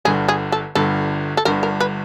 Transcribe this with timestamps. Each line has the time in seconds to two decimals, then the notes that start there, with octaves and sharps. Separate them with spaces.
0.05 G1 G2 D3 G#4
0.28 G#4
0.52 A4
0.75 G1 G2 D3 A4
1.37 A4
1.45 G1 G2 D3 A#4
1.63 A#4
1.80 B4